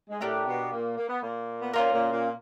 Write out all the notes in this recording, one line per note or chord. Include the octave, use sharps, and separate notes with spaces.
G#3
A2 A3 D4 G4 A#4
B2 B3
A#2 A#3
A#3
B3
A#2 A#3
B3
A#2 A#3 C#4 F4 A#4
A#2 A#3
A#2 A#3